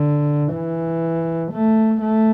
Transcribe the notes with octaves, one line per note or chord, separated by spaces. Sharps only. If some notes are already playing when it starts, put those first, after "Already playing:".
Already playing: D3
E3
A3
A3